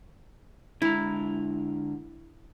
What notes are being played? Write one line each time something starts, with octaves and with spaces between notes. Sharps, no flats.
D3 G#3 E4 A#5